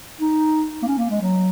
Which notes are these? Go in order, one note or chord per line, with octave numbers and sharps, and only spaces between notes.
D#4
A#3
C#4
A#3
G#3
F#3